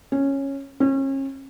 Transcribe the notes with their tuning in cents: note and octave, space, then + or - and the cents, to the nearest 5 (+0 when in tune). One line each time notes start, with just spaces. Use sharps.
C#4 -10
C#4 -35